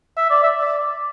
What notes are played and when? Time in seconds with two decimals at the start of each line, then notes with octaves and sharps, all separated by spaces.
0.17 E5
0.30 D5
0.43 E5
0.61 D5